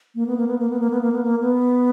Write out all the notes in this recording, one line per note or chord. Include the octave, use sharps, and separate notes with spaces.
A#3
B3
A#3
B3
A#3
B3
A#3
B3
A#3
B3
A#3
B3